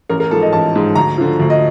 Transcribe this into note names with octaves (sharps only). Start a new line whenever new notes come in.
A1 A#4
A#4
G#2 F3 A4
D#5
A1 A5
G#2 F3
D2 A#5
D3 F3
D2
D#5